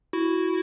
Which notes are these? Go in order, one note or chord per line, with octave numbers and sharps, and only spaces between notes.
E4 F#4